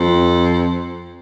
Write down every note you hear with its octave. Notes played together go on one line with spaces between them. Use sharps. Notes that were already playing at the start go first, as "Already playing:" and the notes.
Already playing: F2